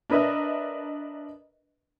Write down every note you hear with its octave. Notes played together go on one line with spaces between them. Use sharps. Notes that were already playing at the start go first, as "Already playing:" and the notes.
D4 A#4 B4 D#5 E5